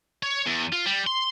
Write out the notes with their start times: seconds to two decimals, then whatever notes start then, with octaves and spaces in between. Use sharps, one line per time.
0.23 C#5
0.46 E2
0.72 F4
0.86 G3
1.07 C6